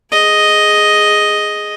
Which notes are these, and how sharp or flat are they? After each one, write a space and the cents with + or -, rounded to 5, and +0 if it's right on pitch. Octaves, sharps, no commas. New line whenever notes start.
G#4 +0 D#5 +0